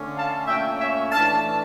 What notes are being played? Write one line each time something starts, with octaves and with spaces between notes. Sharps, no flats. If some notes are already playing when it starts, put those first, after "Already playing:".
Already playing: D3 A3 C#4
F5 A5
A#2 A3 C#4 E5 G5
C#5 E5
E3 A3 D4 F5 A5